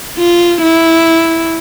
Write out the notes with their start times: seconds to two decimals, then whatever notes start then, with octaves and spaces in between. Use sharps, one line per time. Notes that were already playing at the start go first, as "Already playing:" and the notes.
0.18 F4
0.62 E4